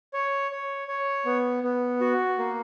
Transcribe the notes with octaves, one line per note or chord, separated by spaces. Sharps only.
C#5
C#5
C#5
B3
B3
F#4
A#3